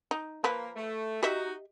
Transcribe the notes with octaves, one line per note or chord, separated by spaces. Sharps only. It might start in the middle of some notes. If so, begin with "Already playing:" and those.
D#4
F3 A#3 B4
A3
D#4 F#4 G4 D#5 E5